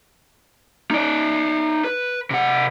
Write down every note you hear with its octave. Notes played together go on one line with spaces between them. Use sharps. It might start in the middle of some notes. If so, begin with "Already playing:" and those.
D#4 D5
B4
C3 F#5